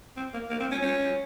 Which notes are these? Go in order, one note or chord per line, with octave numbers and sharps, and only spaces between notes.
C4
A#3
A#3
C4
C#4
C#4